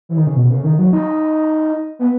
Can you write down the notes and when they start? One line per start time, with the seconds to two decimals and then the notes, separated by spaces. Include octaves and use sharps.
0.09 E3
0.17 D#3
0.27 C#3
0.36 B2
0.50 C#3
0.64 D#3
0.79 F#3
0.93 D#4
1.99 B3